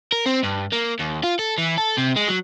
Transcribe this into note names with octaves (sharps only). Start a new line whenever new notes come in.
A#4
C4
G2
A#3
D#2
F4
A4
E3
A4
C3
G#3
F#3